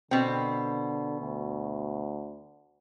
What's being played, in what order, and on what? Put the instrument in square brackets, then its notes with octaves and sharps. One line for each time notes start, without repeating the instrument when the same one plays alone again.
[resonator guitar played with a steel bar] B2 C4 [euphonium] D3
[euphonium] D2